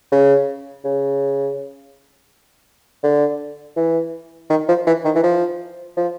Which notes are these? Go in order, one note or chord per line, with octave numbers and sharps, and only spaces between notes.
C#3
C#3
D3
E3
D#3
F3
E3
D#3
E3
F3
F3